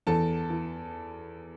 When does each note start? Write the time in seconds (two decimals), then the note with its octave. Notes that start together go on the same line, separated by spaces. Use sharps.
0.07 E2 A4 A5
0.50 E3